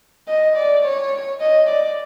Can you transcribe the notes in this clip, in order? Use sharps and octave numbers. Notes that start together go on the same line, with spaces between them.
D#5
D5
C#5
D#5
D5